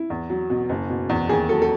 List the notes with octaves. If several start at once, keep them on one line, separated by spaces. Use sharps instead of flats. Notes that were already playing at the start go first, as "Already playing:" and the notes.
Already playing: E4
E2
F#3
B2
F#1
B2
E2
D#2 G#4
F#3 A4
A4